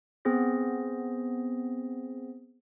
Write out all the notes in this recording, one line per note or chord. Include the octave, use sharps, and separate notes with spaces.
B3 C4 G#4 C5 A#6